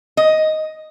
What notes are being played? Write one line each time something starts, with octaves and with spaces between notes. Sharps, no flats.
D#5